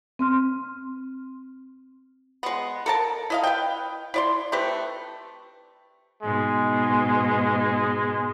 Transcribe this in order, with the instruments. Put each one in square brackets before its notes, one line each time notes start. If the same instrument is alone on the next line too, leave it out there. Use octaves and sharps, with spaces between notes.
[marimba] C4 C6 F6
[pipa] G#3 B3
A4 A#4 A5
E4 D#5 F5
B4 G5
E4 D5 C6
A3 C4 G4 B4
[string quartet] G#2 B2 [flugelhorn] G#3